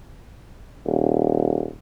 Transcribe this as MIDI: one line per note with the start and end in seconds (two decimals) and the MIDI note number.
0.85 1.69 27